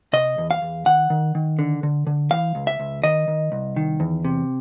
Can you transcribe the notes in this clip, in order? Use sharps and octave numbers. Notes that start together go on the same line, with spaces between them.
C3 D#5
E2
F5
E2
D#3 F#5
D#3
D#3
D3
D3
D3
E3 F5
C#2
E5
C#2
D#3 D#5
D#3
C2
D#3
E2
C3